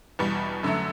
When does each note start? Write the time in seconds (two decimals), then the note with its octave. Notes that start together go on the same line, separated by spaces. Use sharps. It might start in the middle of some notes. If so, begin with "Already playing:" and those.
0.19 E2 B2 G3
0.63 F#2 D3 F#3 A3